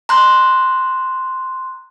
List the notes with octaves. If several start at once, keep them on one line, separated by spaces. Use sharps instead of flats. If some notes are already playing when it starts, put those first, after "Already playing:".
A#5 C6 F#6